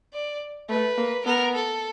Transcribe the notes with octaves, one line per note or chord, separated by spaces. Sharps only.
D5
A3 B4
A#3
B3 A#4
A4